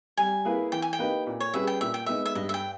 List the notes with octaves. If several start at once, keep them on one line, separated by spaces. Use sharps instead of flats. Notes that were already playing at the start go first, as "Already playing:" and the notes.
G3 G#5
A#3 E4 G#4 B4
E3 G5
G#5
G5
A#3 D#4 G4 B4
A#2
C#5
G3 C#4 G#4 B4 E5
G5
A#2 E5
G5
G#3 B3 D#4 E5
E5
G2 D#5
E5
G5